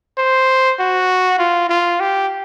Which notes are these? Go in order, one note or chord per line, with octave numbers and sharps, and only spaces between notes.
C5
F#4
F4
F4
G4